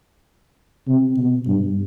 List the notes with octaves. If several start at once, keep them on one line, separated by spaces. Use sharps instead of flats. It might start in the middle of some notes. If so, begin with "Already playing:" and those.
C3
B2
G2